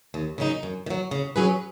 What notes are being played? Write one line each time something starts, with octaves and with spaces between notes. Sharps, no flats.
D#2
C#3 F#3 A#3 D#4
F#2
D#3
F#3
C#3
F#3 C#4 G#4 B4